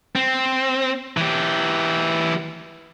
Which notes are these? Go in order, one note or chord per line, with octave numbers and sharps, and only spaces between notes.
C4
E3 G4